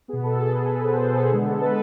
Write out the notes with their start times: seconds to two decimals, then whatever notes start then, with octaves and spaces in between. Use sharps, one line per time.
0.08 B3 G#4
0.13 B2
0.23 A4
0.40 G#4
0.54 B4
0.70 B4
0.84 C5
1.00 A4
1.15 G#4
1.31 D3 G#3 B3 G#4
1.46 A4
1.61 B4